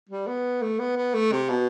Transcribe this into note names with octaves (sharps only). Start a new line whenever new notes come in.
G3
B3
A3
B3
B3
A3
C3
B2